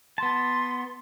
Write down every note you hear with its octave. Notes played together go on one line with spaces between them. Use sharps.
B3 A5 C6